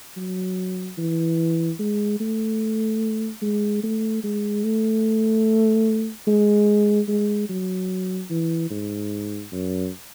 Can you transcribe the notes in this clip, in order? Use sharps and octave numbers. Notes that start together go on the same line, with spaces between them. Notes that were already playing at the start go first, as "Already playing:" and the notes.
F#3
E3
G#3
A3
G#3
A3
G#3
A3
G#3
G#3
F#3
E3
G#2
F#2